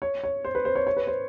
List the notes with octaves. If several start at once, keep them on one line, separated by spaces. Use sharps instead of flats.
C#5
C#5
C5
B4
C5
C#5
C#5
B4
C5